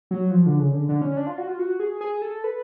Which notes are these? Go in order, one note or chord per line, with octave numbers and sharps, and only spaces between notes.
F#3
F3
D3
C#3
D3
D3
C#4
D4
F4
F#4
F4
F#4
G#4
G#4
A4
B4